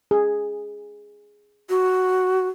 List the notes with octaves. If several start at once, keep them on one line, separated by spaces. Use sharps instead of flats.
G#4
F#4